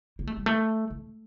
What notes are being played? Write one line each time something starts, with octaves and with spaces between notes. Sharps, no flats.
A#3
A3
G3
A3
A3